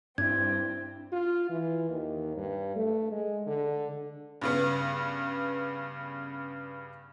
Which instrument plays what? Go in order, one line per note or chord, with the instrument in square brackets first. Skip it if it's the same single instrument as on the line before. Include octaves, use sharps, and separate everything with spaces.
[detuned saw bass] G2 [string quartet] C4 [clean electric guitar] D4 E4 [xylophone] G#6
[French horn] F4
E3
D#2
G2
A3
G#3
D3
[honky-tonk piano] G2 C#3 B3